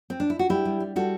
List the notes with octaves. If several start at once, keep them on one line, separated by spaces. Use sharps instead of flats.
C4
D4
E4
F#4
G3 E4 G4
G3
G3
G3 F#4 A4